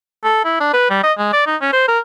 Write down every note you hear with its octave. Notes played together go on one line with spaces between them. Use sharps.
A4
E4
D4
B4
G3
D#5
G#3
D5
D#4
C#4
C5
A#4